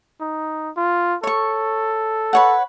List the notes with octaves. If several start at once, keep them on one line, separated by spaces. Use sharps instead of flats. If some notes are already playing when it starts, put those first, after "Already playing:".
D#4
F4
A4 C#5 C#6
B4 C#5 F#5